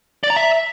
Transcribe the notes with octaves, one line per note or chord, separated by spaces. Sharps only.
D5
A#5
E5